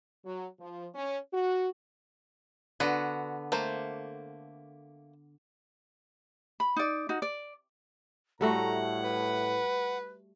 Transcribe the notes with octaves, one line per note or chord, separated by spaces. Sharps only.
F#3
F3
C#4
F#4
D3 B3 F#4
A3 A#3 C5
B5
D#4 D5
D#4 F#4
D5
A2 G3 A3 F#4 F#5 A#5
B4